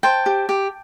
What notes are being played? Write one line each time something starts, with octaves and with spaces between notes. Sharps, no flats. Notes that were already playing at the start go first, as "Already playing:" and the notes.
C5 G5 A5
G4
G4